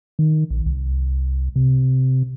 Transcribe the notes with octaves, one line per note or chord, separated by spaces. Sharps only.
D#3
A#1
C2
C3